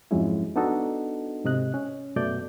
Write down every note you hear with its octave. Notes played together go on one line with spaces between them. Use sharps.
F2 G#2 F#3 G#3 C#4 E4
B3 D4 D#4 F#4 A4 D#5
G#2 C3 D#5 F#6
C#4
F#2 B2 A3 D5 G6